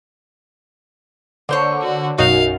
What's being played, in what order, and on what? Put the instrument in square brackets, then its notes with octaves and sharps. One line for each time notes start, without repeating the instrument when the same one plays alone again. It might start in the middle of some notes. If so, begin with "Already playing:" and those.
[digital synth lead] D3 [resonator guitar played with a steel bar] A#3 C5 C#5
[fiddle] F#4
[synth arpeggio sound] B1 D#4 F#4 [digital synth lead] F#2 [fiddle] F5